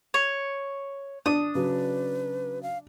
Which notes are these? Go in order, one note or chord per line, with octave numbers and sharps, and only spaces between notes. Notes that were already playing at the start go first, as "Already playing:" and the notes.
C#5
D4 D#6
C#3 F#3 B4
F5